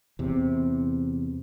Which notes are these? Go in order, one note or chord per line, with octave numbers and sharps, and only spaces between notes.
E2 C3